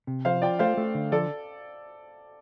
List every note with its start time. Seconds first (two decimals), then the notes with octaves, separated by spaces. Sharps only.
0.07 C3
0.25 F3 C5 F5
0.42 F4 D5 G5
0.59 A3 C5 F5
0.77 A3
0.95 D3
1.12 F3 A4 D5